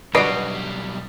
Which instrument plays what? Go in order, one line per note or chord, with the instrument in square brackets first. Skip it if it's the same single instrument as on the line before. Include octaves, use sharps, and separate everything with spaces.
[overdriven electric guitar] B1 G3 [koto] D4 F#4 [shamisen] B4 [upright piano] D#5 C7 D7